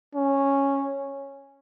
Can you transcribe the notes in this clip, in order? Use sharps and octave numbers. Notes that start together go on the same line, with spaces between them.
C#4